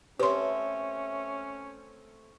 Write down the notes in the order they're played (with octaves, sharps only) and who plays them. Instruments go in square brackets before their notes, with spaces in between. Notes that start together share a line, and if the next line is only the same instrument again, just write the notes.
[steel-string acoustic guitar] A3 C4 [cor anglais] C#4 [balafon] G4 C#5 C6 [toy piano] B4 D#6